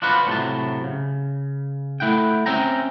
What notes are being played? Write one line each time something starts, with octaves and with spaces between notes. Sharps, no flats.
D4 F4 F#4 B4 C5
A2 C3 F#3 A5
C#3
A3 E4 F#5 G5
C4 C#4 E5 G5 A#5